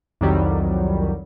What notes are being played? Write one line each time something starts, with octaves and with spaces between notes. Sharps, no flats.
C2 F2 D#3 F#3 G3